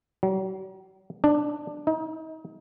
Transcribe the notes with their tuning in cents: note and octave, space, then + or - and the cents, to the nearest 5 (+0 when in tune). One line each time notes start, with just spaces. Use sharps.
F#3 +45
D4 +10
D#4 +35